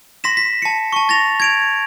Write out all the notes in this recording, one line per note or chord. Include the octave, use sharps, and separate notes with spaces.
C6 A#6 B6 E7
B6
A5 C#7
A5 C#6
A6 A#6 F7
G#6 D7 F7